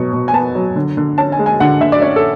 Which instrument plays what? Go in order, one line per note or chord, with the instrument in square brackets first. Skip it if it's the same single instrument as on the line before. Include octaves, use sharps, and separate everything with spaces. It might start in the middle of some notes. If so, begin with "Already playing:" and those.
Already playing: [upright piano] B2 F#3 C#6
B2
G#5
B3 A5
F#3
D3
D3
C#4 A5
G#5
G#3
G#5
D3 F#5
D3 E5
D5
C#4 C#5
A4